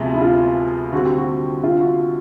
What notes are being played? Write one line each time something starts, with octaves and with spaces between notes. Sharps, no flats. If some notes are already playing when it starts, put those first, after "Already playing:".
Already playing: D2 C3 F3 G#3 B3
E4
F4
D3 G3 C4 F#4
G4
F#4
F4
F#4